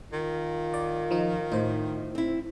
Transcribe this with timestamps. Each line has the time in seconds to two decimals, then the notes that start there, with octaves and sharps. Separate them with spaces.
0.13 D#3 F4
0.74 D5
1.11 F3 D#4
1.52 A2 D#4 C5
2.15 C4 E4